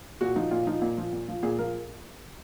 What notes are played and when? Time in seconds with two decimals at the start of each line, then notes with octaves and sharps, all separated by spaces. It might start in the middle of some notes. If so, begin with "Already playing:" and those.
0.21 A#2 F#4
0.36 F3 D#4
0.51 A#2 F4
0.67 F3 D#4
0.82 A#2
0.98 F3
1.13 A#2
1.28 F3
1.43 A#2 G#4
1.59 F3 A#4